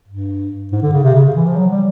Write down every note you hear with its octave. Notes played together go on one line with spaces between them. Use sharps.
G2
G#2
D3
C#3
C3
C#3
E3
F3
F#3
G3